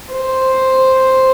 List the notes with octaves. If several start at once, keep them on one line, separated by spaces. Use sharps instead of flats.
C5